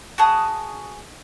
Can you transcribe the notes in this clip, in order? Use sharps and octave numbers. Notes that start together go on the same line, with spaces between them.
F#4 G#4 A5 D#6